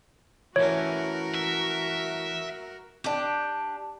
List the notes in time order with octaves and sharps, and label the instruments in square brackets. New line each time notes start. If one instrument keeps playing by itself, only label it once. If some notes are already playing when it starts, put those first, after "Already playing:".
[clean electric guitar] E3 A3 C#4 [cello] F#4 A#4 [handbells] C#5
[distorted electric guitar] E5
[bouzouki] D4 G4